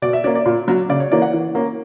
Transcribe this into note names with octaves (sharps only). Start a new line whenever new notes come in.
B2 D5
E5
A#3 C#4 D5
D5
A#2
F#3 C#4
C#3 D5
C#5
E3 A#3 C#4 D5
F#5
E3
A#3 C#4